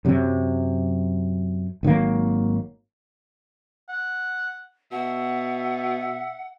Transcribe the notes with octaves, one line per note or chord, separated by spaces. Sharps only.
F#2 C3 F#3
G#1 D#3 F#3 A#3
F#5
B2 E5 F#5